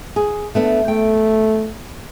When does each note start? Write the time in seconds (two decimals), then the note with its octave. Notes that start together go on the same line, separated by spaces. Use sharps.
0.16 G#4
0.55 A3 B3 D4
0.88 A3 G5